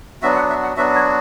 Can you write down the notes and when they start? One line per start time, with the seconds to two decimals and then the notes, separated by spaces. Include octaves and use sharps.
0.22 F#3 B3 D4 F#4 E5
0.36 F#5
0.50 E5
0.63 F#5
0.76 F#3 B3 D4 F#4 E5
0.95 C#5